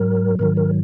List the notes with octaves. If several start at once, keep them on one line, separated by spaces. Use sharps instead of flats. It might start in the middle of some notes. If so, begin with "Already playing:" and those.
Already playing: G#2 F#3 A#4
G#2 D#3 F#3 A#4
A#4